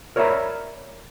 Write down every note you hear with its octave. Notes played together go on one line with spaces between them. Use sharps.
A#4 C#5 D5 E5 A#5 B5